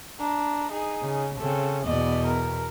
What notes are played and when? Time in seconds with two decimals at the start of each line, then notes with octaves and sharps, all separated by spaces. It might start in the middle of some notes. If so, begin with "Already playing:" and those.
0.19 D4 A#5
0.71 D#4 G#4
1.02 C#3
1.38 C#3 C4 A4
1.84 E2 B2 D5 D#5
2.25 A#4